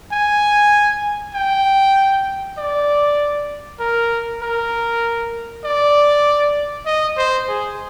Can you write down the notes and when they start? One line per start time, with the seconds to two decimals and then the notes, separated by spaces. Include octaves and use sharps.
0.12 G#5
1.34 G5
2.58 D5
3.80 A#4
4.42 A#4
5.64 D5
6.86 D#5
7.17 C5
7.49 G#4